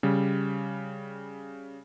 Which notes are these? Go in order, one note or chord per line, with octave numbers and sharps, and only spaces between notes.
C#3 G3